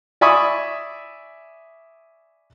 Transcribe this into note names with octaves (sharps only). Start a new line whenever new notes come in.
D5 E5 G#5 B5 C#6 D#6